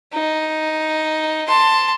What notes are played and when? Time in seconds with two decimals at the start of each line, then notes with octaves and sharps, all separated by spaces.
0.13 D#4
1.48 A5 C6